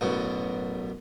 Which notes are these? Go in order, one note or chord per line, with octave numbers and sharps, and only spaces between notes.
A1 F#2 B2